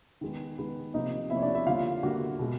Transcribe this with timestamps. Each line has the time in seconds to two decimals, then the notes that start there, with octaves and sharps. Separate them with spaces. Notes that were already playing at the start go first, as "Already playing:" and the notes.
0.21 D#3 G#3 B3
0.58 D#3 G#3 B3
0.94 C3 F3 A#3 D#4 D#5
1.30 C3 F3 A#3 E4 E5
1.37 C#5
1.42 D4 D5
1.55 E4 E5
1.66 D3 G3 A#3 F4 F5
2.03 D3 G3 A#3 F#4 F#5
2.39 B2 G#3